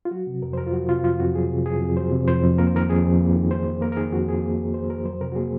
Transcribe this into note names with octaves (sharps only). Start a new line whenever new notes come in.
F4
F#3 F#4
C3
F2 A#4
C5
F2 A#4
F4
F#3 F#4
C3 F4
F2 F4
F2 F#4
F#3 G#4
C3
F2 G#4
F2
F#3 C5
C3
F2 C5
F2
A#3 A#4
C5
D#3 A#4
F2 G#4
F2
A#3
D#3
F2 C5
F2
A#3 A#4
A#4
D#3 G#4
F2 F#4
F2 G#4
A#3
D#3
F2 C5
F2 A#4
F#3 C5
C3 A#4
F#4
A#3 G#4